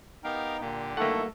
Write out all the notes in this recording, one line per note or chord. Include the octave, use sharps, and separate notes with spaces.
B3 D#4 G4 A#4 F5 G5
A#2 D3 A#3 G4
G2 D#3 F#3 A3 A#3 E4 A4 F#5